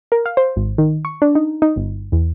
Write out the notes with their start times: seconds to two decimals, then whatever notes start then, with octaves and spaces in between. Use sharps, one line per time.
0.12 A#4
0.26 F5
0.37 C5
0.56 G#1
0.78 D#3
1.05 C#6
1.22 D4
1.35 D#4
1.62 D#4
1.76 G1
2.12 E2